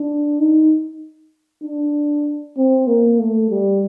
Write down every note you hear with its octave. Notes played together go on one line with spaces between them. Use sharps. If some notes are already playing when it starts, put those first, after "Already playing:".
Already playing: D4
D#4
D4
C4
A#3
A3
G3